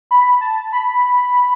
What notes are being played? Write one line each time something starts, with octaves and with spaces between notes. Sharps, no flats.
B5
A5
B5